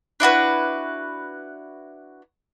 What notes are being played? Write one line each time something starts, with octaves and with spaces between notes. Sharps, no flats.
D4 E4 F#4 B4